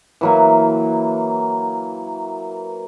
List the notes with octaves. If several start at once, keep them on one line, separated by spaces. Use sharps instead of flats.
E3 F#3 A#3